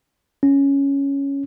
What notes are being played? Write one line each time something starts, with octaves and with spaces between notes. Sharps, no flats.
C#4